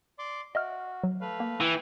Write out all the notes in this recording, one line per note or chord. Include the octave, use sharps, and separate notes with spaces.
D5 C6 D6
F#4 D#5 E5 F6
F#3
A3 B4 F5
A#3
E3 G5